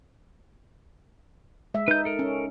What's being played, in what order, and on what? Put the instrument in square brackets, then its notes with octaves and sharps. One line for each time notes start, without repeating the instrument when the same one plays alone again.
[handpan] G#3 E5
[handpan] D#4 [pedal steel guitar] B4 G6
[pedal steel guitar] A4 A#4
[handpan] C#4